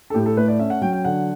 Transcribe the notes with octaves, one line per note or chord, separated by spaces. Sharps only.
A4
A2 G4
A4
A3 B4
D5
C#4 E5
F#5
F#3 G5
G5
D3 F#5